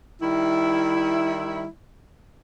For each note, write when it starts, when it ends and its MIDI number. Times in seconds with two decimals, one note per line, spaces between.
0.22 1.67 51
0.22 1.67 55
0.22 1.67 64